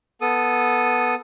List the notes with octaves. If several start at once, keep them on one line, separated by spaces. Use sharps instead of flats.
B3 A4 D#6